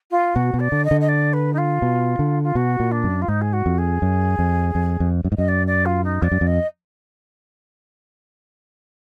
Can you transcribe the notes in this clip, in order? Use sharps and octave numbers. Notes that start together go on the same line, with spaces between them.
F4
B2 F#4
B2
D5
D3
D#5
D3
D#5
D5
B4
D#4
F4
B2
D3
F4
B2 F#4
A#2
D4
F#2
F4
G#2 D#4
G#4
F#4
F2
G#4
F#2
F2
F2
F2
F#2
G#2
F#2 D#5
D5
D5
F4
D#4
F2 D5
F#2
F2
D#5